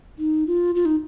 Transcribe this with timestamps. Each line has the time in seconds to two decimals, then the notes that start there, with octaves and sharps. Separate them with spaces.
0.19 D#4
0.47 F4
0.75 F4
0.85 D#4